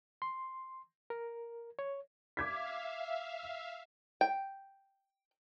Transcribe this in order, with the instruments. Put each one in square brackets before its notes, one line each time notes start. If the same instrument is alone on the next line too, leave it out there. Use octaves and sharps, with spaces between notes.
[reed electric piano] C6
A#4
C#5
[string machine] E5 F5 [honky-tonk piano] D6 G#6 B6
[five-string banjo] G5